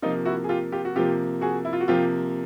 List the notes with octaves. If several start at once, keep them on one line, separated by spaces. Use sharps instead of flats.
C3 F3 A#3 D#4 F4
E4 F#4
G#4
F4 G4
F4 G4
F#4
C3 F3 A#3 F4 G4
F#4 G#4
E4
F4
F#4
C3 F3 A#3 F4 G4